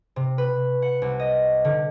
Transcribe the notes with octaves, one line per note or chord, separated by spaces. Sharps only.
C3
B4
F#5
C2
D#5
D3